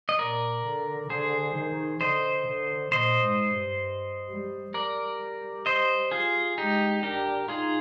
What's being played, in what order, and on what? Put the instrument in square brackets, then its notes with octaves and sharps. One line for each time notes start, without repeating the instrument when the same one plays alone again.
[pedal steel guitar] D#5
[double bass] A#2 [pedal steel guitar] A#4 D5
[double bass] D3
[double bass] D3 [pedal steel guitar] G#4 C5
[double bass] D#3
[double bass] D3 [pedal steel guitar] C5 D#5
[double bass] D3
[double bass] A#2 [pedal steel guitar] C5 D#5
[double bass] G#2
G2
G3
[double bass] G3 [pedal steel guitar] A#4 D5
[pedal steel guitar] C5 D#5
F4 G#4
[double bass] G#3 [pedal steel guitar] D#4 G4
[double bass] D4 [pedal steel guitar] G4 A#4
[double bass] D#4 [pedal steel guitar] F4 G#4